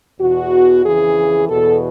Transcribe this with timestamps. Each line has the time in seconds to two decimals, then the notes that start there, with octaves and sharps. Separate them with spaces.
0.19 E2 B2 F#4
0.84 F2 C#3 E3 G#4
1.49 E2 B2 A4